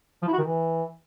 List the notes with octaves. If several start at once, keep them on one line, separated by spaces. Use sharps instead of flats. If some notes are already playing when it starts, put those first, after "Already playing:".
F3
E4
F#4
D#3
E3